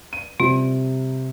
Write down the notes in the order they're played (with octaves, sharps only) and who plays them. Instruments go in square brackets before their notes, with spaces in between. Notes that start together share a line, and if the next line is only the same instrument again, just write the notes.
[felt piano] D#7
[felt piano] C3 G3 [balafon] F4